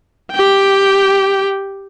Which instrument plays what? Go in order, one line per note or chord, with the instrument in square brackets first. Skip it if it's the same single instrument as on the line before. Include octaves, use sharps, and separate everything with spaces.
[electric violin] G4 G5